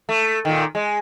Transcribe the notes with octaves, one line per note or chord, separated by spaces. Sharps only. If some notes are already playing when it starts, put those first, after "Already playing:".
A3
A#2 D#3
G#3